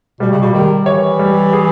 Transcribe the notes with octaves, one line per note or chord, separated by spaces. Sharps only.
B2 G3
C#3
B2
D#3 G3
E3 C#5
G3
G#4